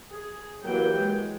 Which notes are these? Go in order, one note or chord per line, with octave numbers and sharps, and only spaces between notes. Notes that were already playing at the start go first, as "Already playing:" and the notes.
G#4
E3 F#3 A#3 G4 G5
G#3